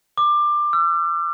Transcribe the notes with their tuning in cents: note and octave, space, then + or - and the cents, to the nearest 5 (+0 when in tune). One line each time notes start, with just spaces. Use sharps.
D6 +20
E6 +45